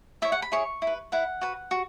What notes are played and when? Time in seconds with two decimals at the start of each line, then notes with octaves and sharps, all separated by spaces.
0.22 E4 C#5 E5
0.32 F#5
0.42 B5
0.52 E4 G#4 C#5 C#6
0.82 E4
0.87 B4
1.12 E4 B4 F#5
1.41 F#4 B4
1.71 F#4